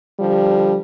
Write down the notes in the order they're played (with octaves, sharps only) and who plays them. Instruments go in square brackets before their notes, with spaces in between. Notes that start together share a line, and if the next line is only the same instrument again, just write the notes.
[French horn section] D3 F3 G3